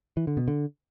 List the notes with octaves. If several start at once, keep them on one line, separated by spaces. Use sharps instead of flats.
E3
D3
B2
D3